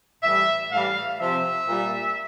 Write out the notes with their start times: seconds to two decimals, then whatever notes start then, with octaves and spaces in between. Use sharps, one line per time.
0.23 A2 E3 G3 E5
0.72 A2 E3 G3 F5
1.20 C3 F3 E5
1.69 A#2 G3